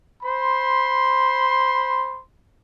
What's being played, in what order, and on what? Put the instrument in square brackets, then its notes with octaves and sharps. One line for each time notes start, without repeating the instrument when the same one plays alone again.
[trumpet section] C5 B5 C6